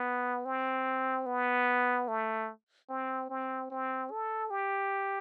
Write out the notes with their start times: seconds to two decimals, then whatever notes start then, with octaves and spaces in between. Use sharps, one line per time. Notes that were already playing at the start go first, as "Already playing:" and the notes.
Already playing: B3
0.45 C4
1.26 B3
2.08 A3
2.90 C4
3.30 C4
3.70 C4
4.11 A4
4.50 G4